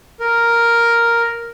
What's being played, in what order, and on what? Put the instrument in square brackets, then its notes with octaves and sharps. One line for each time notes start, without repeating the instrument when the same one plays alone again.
[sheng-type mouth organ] A#4